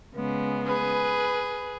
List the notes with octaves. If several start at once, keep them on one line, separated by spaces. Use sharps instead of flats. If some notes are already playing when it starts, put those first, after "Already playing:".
C#3 G#3 B3
G#4 B4